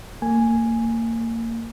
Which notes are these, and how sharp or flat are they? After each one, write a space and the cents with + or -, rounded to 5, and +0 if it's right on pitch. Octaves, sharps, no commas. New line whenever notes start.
A#3 -30 G#5 +0